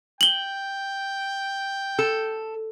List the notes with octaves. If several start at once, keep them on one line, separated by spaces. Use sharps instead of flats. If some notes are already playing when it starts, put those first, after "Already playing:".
G5 F#7 G7
A4